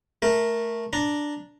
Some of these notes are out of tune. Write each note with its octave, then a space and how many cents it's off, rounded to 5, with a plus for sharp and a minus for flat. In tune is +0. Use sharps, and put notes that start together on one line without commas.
A3 +0 A#4 +0
D4 +0 A#5 +0